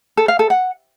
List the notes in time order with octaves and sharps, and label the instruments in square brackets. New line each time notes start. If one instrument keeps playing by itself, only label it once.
[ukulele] A4
F5
A4
F#5